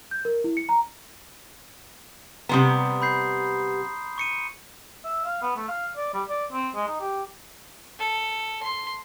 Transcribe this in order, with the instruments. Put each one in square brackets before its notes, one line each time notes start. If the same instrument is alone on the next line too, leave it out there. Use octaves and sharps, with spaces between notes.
[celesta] G6
A#4
E4
C#7
A#5
[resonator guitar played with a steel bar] C3 G3 B3 [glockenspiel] A#5 C6 D#6
[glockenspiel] B5 G6 C7
C#6 C#7 D#7
[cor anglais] E5
F5
B3
A3
F5
D5
G3
D5
C4
G#3
D#4
G4
[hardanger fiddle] A4
C6